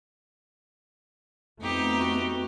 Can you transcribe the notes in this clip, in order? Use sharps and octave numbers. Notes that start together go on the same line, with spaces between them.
F2 A3 B3 D#4 G4
F#4